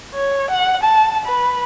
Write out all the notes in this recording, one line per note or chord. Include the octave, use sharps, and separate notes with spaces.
C#5
F#5
A5
B4